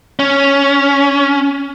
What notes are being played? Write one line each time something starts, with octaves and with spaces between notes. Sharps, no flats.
C#4